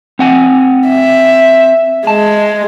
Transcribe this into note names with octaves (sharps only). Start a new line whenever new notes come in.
C4 F#5 G#5
E5
G#3 A5